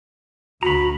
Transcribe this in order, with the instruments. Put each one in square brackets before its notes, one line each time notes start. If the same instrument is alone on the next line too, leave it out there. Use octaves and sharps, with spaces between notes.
[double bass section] D2 [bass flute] F#4 [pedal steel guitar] A#5 B5